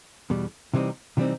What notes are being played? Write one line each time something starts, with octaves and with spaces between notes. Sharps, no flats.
E2 B2 G3
C3 E3 G3 C4 D#4
C3 E3 G3 C4 D#4